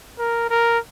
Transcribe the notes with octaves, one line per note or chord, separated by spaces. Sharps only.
A#4
A#4